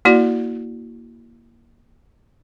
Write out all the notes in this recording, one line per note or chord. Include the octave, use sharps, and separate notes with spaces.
A#3 E4 F#4 D5